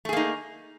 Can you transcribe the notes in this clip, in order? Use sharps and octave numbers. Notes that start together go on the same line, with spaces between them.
A3 A#3 D#4 G#4